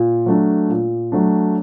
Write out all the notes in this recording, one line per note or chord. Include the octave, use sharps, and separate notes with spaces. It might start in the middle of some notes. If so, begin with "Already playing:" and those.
Already playing: A#2
F#3 A3 D4
A#2
F#3 A3 D4